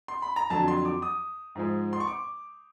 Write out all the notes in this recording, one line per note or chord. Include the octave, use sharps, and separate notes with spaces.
C6
B5
A#5
F2 D3 F#3 A5
C6
D6
D#6
G#2 F3 G#3
C6
C#6
D6